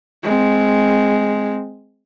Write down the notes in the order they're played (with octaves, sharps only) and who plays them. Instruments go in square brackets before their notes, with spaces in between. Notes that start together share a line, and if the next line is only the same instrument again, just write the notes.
[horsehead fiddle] G#3 C4